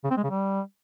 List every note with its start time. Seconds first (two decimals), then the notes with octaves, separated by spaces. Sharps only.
0.04 C#3
0.11 C4
0.17 G#3
0.24 C#3
0.30 G3